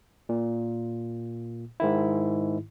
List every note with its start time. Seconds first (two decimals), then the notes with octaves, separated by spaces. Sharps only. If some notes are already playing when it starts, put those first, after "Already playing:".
0.29 A#2
1.80 G#2 D#3 E4